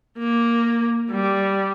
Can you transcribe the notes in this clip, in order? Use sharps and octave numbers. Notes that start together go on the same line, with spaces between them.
A#3
G3